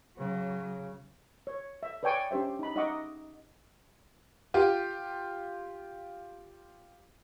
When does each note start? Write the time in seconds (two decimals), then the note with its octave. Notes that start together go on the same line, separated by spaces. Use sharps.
0.18 C#3 F#3
1.47 C#5
1.83 E5
2.03 B4 C#5 D5 G5 G#5 C#6
2.31 C#4 D4 G4 C5 E5
2.59 D#4 B5
2.75 D#4 D#5 E5 F#5 C#6 D6
4.54 F4 G4